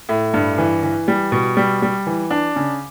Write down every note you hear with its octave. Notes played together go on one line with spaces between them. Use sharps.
A2
G2
E3
E3
G3
B2
G3
G3
E3
D4
C#3